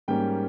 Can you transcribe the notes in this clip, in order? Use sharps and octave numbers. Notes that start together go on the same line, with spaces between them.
G#2 G3 A#3 C#4 G5